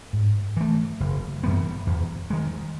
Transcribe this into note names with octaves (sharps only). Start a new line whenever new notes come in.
G#2
E3 A3
F#1
F#2 E3 B3
E2
D#3 G#3